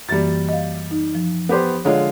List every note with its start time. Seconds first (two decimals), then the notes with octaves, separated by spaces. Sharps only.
0.09 F#2 E3 G3 A#3 A6
0.49 D#5 F5
0.91 D#4
1.15 F3
1.49 B3 G4 C5
1.85 D3 G#3 F4 C#5 F5